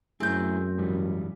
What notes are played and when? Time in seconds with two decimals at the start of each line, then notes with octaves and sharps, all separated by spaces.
0.20 F#2 A3 C4 E4 G#4 G6
0.78 G#2 E3 G3